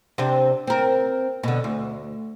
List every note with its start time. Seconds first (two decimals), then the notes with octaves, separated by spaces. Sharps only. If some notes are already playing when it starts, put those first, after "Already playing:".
0.18 C3 C4 D4
0.67 C4 A#4
1.43 B2 D3
1.64 D2